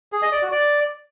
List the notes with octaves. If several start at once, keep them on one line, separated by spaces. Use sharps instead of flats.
G#4
D#5
D5
F#4
D5